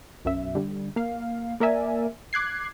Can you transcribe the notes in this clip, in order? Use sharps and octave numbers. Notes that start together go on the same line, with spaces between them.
B1 F#2 E5
D3 G3
A#3 F5
A#3 A#4 D5 E5 G#5
D6 F#6 G#6 C7